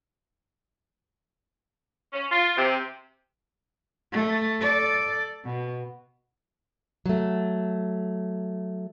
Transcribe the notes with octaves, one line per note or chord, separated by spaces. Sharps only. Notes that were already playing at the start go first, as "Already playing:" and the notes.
C#4
F4
C3
A3
A4 D5
B2
F#3 A3